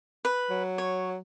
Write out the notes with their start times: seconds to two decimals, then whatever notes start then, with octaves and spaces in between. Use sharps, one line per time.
0.25 B4
0.50 F#3
0.78 C#5